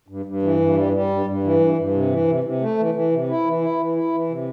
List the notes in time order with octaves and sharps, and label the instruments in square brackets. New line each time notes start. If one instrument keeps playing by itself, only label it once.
[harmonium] G2
G2
E3
G2
G3
G3
G2
G2
E3
G2
G2
C3
E3
C3
C3
A3
E3
E3
C3
E4
E3
E4
E3
E4
E3
C3